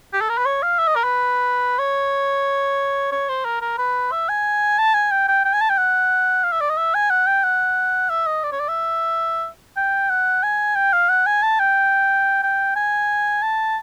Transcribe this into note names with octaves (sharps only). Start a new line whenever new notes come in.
G4
A4
A#4
B4
C#5
F5
E5
D#5
A#4
B4
C#5
C#5
C5
A#4
A#4
B4
E5
G#5
A5
G#5
G5
G5
G5
G#5
A5
G5
F#5
F5
E5
D5
D#5
E5
G#5
F#5
G5
F#5
E5
D#5
D5
C#5
D5
E5
G5
F#5
G#5
G5
F5
F#5
G#5
A5
G5
G5
G#5
A5